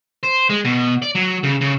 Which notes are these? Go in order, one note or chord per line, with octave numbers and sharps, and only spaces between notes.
C5
G#3
B2
D5
F#3
C#3
C#3